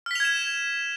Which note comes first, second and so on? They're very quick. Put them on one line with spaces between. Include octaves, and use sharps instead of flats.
F6 B6 F7 G#6 E7